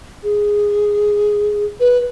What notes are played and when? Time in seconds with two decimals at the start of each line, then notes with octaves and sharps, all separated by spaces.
0.23 G#4
1.80 B4